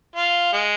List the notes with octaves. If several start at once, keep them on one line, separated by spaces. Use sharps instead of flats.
F4
G#3